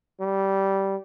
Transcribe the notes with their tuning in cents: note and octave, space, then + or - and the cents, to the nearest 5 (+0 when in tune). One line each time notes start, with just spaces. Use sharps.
G3 -15